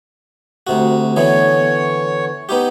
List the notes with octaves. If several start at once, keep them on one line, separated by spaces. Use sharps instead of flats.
D2 C3 F#4
D3 E3 B3 C#5
B3 D#4 G4